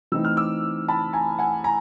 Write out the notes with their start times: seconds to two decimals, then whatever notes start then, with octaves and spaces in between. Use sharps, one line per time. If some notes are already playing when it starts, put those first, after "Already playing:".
0.12 E3 A3 C4 D#4 E6
0.25 F6
0.37 D6 E6
0.88 A5 B5
1.13 G#5 A#5
1.38 F#5 G#5
1.64 G#5 A#5